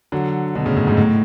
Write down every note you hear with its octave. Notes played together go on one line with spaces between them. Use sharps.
D3 F#3
B2 D3
A2 C#3
A2
G#2
A2